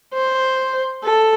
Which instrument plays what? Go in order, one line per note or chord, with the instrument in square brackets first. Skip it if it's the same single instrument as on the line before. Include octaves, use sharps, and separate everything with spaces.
[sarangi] C5
A4